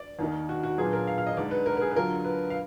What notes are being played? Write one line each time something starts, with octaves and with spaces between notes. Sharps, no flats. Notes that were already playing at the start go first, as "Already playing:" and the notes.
Already playing: D5
D#2 D#3 A#3 D#4
F#4
F#4
A#2 F#3 B3 D4 F4 G#4
A#4
F5
F5
D#5
D2 D3 G#3 D#4 D5
B4
A#4
A#4
G#4
B4
D2 D3 F#3 D4 F4 A#4
B4
F5